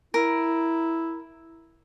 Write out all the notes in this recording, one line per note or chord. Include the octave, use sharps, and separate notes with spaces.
E4 A#4